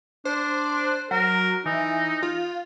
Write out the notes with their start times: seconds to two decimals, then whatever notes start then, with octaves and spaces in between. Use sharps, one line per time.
0.25 D4 C5
1.11 F#3 A#4
1.65 E3 D#4
2.23 F4